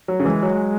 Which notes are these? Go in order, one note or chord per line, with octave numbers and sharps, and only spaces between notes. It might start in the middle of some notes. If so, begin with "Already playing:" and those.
F#3
C#3
E3 G#3
F#3